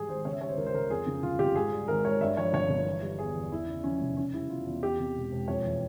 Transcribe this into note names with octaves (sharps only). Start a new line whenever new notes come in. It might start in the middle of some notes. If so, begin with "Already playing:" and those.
Already playing: G#2 E3 G3 G4 G#4
G#1 C5
C#3 C#5
E5
G3 C#5
C5
C#2 A#4
C5
C#2 A#4
F2 G#4
C#3
G1 F4
G1 G4
G#2 G#4
G3
G#1 A#4
G#1 C#5
G2 E5
F3 C#5
G1 C#5
G1
E3
G3
E2 G#4
E2
E2 E4
C#3
F3 C#4
F1
C#3 C#4
G3 E4
E2 F4
E2
E2 G4
C3
E1
E1
F2 C#5
E3